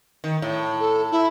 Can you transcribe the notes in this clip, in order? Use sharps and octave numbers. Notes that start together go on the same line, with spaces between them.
D#3
A2
A4
E4